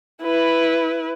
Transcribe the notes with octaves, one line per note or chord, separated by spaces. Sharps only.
E4 B4